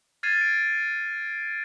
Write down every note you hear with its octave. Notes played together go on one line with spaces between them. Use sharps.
F6 G#6 A6 C7 D#7
D7